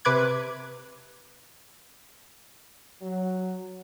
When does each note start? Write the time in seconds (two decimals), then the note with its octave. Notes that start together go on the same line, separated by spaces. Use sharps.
0.05 C3 B4 D6 F#6 G#6
3.02 F#3